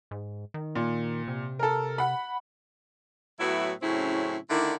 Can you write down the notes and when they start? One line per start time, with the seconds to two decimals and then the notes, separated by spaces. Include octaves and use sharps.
0.11 G#2
0.54 D#3
0.76 A#2
1.28 C3
1.59 A4 A#4
1.98 F#5 B5
3.40 A2 F#3 B3 E4 F#4 E5
3.82 A2 C#3 F#3 C4 C#4 E4
4.50 D3 D#3 A3 D4 E4